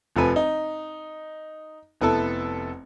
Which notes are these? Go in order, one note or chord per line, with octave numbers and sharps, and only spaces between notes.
F1 F3 A4 B4 G#5
D#4
F1 B3 E4 A4 A5